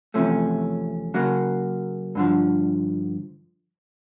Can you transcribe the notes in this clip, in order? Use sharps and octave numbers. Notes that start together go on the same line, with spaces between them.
E2 C3 F3 A3 C#4
C#3 F#3 A#3
G2 D3 F3